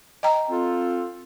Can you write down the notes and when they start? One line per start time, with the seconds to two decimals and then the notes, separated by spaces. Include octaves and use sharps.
0.23 D#5 G5 A#5
0.50 C4 F4 A4